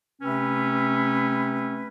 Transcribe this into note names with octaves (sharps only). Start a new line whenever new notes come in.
C3 A3 C4 C#4 B4